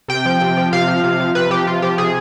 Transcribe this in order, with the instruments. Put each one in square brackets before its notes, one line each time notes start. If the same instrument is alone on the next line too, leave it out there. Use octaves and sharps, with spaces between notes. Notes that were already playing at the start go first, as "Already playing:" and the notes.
[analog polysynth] C3 G5
F3
C3
F3
C3 F5
F3
C3
F3
C3 B4
F3 G4
C3 F4
F3 G4
C3 G#4